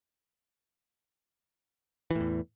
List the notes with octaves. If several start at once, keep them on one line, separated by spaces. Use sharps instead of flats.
E2 A2 E3